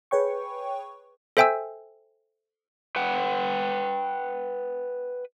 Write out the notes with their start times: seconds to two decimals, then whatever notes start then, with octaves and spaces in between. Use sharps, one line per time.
0.11 G#4 B4 C#5 G5 C#6
1.37 A4 C5 E5 G5 G#5 E6
2.96 B4 F#5 G5